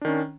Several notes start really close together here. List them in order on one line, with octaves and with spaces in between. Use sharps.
D4 D#3 C#4